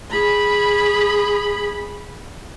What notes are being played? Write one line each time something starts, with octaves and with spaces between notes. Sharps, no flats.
G#4 B5